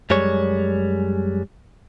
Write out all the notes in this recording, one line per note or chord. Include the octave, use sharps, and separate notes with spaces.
F#2 G3 G#3 C#5